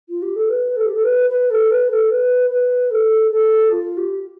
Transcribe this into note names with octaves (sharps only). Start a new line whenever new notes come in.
F4
G4
A4
B4
A4
G4
A4
B4
B4
A4
B4
A4
B4
B4
A4
A4
F4
G4